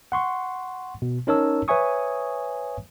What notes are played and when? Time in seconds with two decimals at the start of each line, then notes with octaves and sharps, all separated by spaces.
0.12 F#5 C6 C#6
1.02 B2
1.27 C#4 D#4 A#4 C#5 A5 E6
1.68 B4 C#5 E5 G#5 C#6 D#6